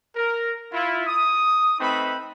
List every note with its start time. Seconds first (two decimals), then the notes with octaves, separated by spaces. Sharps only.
0.16 A#4
0.73 E4 F4
1.07 D#6
1.80 A3 C4 D#4 B4 B5